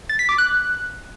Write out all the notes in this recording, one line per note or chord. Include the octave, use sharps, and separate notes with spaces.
A6
B6
D6
F#6